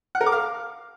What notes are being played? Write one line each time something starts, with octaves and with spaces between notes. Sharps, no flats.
F#5
A#4
D6
F5